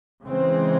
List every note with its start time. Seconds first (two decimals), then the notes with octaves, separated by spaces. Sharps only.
0.24 C#3 E3 G#3 C4